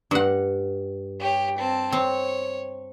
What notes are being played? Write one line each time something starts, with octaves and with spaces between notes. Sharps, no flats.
G2 F#5
G4 C#5
C4 A5
C4 C#5